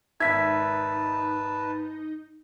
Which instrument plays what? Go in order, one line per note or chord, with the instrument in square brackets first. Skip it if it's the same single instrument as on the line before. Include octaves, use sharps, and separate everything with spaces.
[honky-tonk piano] G#1 E5 [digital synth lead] D#4 [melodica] B4 A5 [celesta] G#6 B6